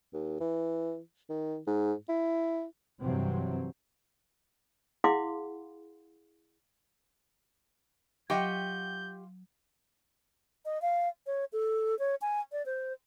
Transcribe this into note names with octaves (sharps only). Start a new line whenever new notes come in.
D#2
E3
D#3
G#2
E4
G2 C3 E3 F#3 C4
E4 G#4 F5 F#5 C6 D6
F#3 F4 G4 D#5 F#5 G5 C#6 G6
D#5
F5
C#5
A4
C#5
G#5
D5
C5